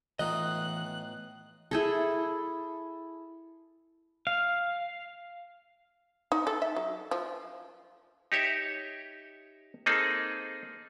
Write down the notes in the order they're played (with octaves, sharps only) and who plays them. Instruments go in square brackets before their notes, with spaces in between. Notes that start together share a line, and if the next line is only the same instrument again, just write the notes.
[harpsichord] A2 D#4 F4 [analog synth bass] E3 [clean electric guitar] B3 D#5 [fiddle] F#6
[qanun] E4 G#4 A4
[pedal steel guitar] F5
[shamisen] D#4
A4
E5
F#3
F3
[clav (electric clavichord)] D#4 G4 C#5 E5
A#3 C4 D#4 G#4 A4